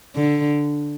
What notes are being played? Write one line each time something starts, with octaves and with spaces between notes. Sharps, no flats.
D3